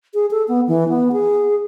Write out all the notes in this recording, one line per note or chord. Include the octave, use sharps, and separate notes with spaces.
G#4
A4
B3
E3
B3
G#4